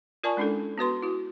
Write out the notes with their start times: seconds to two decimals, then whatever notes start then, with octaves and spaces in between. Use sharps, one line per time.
0.24 F4 A#4 D5 G#5 A5 C#6
0.37 G#3 C#4 D4 E4 A4
0.78 B3 F#4 B4 C6
1.02 E4 F#4